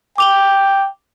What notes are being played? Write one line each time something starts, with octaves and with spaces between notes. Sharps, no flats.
G5 D6 F7 G7